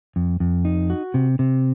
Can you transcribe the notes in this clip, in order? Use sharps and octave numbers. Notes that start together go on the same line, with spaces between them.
F2
F2
D#4
F#4
C3
C3